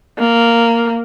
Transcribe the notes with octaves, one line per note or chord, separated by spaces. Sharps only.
A#3